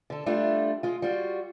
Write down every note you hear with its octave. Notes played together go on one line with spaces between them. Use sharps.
D3 A4
G3 A3 D4 F4
G#3 F4
G3 F4 F#4